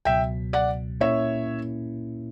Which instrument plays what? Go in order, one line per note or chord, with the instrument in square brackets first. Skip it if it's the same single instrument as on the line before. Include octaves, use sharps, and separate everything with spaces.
[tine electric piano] C#2 B2 F#3 [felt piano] E5 G5
[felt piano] D5 F#5
[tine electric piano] A#2 A#3 C#4 E4 [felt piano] C#5 E5